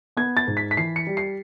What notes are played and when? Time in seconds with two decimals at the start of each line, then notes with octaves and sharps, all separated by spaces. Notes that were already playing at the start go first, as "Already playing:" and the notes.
0.17 B3 G#6
0.37 A6
0.47 G#2
0.57 B6
0.71 B6
0.77 E3 C7
0.96 C#7
1.07 G3
1.17 C7